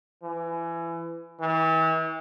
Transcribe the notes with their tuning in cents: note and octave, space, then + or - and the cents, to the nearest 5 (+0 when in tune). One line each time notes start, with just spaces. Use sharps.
E3 +25
E3 -40